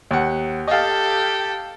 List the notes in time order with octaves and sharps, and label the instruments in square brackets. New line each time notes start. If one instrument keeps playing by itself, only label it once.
[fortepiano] D#2 F#5
[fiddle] G4 A4 [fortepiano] D#5 F5